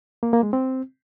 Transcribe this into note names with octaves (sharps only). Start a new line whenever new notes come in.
A#3
A#3
G#3
C4